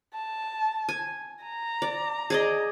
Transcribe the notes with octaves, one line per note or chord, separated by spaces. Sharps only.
A5
G#5
A#5
D5
G#4 D5 D#5